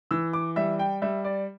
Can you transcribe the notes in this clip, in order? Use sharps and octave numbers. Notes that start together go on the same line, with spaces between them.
E3 E6
D6
G3 E5
G5
G3 E5
D5